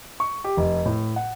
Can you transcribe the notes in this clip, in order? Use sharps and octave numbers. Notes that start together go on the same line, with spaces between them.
C#6
G4
F1
A2
F#5